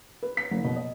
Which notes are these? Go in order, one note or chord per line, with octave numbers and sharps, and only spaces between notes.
B4
B6
F#1
B2
D#5